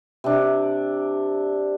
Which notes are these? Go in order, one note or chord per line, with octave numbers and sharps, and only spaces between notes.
C3 D4